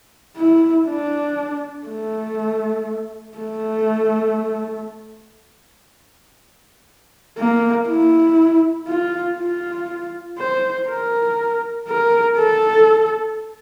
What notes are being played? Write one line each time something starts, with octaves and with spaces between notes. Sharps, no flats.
E4
D4
A3
A3
A#3
E4
F4
F4
C5
A#4
A#4
A4